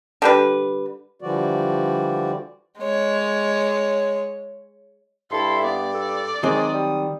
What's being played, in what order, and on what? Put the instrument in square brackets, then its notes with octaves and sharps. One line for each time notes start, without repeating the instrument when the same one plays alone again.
[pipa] D3 G3 B4
[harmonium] D3 E3 F3 G3 F#4 D5
[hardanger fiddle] G#3 C#5
[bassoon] G2 [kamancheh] E4 A4 [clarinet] C6
[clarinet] B3 [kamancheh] D5
[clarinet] A4
[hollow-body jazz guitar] D#3 F#3 C4 [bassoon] G#3 [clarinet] D#6
[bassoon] G3